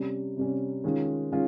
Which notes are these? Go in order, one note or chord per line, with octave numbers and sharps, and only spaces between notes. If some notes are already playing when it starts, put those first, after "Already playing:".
Already playing: C3 G3 C#4
C3 G3 C#4
D#3 G#3 C#4 F4
D#3 G#3 C#4 F4